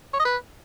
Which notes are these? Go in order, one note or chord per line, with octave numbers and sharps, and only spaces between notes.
C#5
D#5
B4